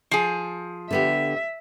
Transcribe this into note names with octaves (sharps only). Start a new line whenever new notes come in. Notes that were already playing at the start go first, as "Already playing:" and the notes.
F3 G#4
D3 B3 G4 E5